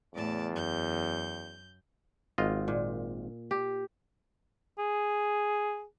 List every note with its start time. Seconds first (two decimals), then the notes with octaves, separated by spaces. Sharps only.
0.14 E2 A2 D5 A5
0.52 F#2 G6
2.38 G#1 F4 D#5
2.68 A#2
3.51 G4
4.79 G#4